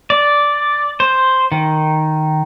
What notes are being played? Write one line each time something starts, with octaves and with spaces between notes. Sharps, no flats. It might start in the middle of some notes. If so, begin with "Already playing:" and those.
D5
C5
D#3